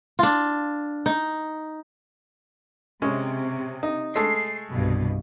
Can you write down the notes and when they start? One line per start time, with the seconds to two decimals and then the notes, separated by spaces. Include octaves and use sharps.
0.19 D4 F4
1.06 D#4
3.02 C3 G#3 C#4
3.83 D#4
4.16 G#3 A3 A4 C7
4.71 C2 G2 B2